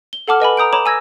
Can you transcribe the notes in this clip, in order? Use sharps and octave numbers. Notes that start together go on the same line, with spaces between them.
G7
A4 F#5 A5 D6 F6
B4 D#5 G#5 B5
A#5 D#6 G6 D7
C#5 A#5 B5 D6 E7
G#5 E6 G#6 A#6